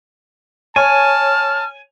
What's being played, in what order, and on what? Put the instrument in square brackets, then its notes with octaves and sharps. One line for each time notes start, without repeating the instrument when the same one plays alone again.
[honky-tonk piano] C#5 [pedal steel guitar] G#5 [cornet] A5 [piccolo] F6